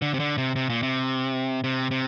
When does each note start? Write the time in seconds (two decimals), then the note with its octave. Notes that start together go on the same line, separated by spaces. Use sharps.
0.02 D3
0.14 C3
0.20 D3
0.38 C3
0.56 C3
0.69 A#2
0.83 C3
1.64 C3
1.91 C3